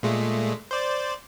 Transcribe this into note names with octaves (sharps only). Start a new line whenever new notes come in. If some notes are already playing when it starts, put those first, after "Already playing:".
A#2 G#3 A3
C5 D5